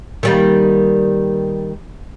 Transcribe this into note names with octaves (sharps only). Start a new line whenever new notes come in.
D#3 G3 A#3